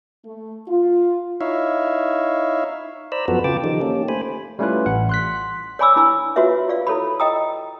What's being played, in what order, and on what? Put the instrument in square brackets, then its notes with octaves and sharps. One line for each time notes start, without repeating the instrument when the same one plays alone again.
[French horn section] A3
F4
[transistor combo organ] D#4 E4 C#5 E5 F5
[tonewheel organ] C5 D5 A#5 B5 E6
F#2 F3 B3 F#4 A4 B4
C#3 F4 G5 A5 D6
D#3 F3 D#4 G4 A4
A#3 C#4 G4
A3 C5 G#5 B5
[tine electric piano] G3 A3 C#4 E4 F4 B4
A1 F#5
C6 F#6 B6
[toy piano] C#5 D5 G#5 B5 D6 E6
D4 E4 G#5 B5
F4 F#4 B4 C#5 E5 F5
F4 D5 F5
E4 A4 C#5 B5
D#5 G5 A#5 D#6